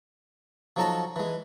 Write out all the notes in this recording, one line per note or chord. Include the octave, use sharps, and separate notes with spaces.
F3 F#3 D#4 A4 A5 A#5
E3 G#3